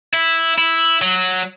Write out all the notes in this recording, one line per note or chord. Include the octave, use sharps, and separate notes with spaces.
E4
E4
F#3